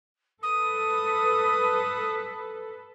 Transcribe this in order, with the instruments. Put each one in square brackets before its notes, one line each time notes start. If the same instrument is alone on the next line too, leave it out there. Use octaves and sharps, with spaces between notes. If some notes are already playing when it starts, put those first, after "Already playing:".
[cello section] A4 B4 [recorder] D#6